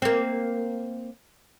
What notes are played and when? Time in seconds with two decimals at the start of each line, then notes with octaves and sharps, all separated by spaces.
0.02 A#3 C4